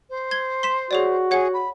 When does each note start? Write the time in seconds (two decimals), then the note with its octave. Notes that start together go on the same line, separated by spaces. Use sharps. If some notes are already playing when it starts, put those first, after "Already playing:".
0.10 C5
0.31 G#6 G7
0.63 C6 B6 E7
0.91 F#4 G#4 C#5 D5
1.31 G#4 C#5 F#5
1.54 B5